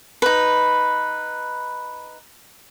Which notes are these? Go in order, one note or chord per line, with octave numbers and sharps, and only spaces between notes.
D#4 B4